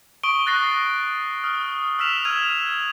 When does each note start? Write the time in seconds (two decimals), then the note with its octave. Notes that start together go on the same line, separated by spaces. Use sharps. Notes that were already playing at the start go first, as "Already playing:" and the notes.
0.23 C#6 D#6 D7 G7
0.46 C#6 F#6 A6 A#6 C7 G7
1.44 D#6 F6
1.99 E6 F6 B6 E7 F7
2.25 E6 F6 G#6 D#7 F7